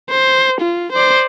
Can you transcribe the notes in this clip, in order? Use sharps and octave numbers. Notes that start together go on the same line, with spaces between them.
C5
F4
C5 D5